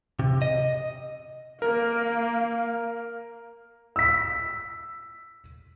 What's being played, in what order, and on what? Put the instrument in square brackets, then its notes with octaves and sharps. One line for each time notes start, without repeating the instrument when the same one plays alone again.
[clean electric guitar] C3
D#5
[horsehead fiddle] A#3 F5 [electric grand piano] A#4
[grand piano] E6 B6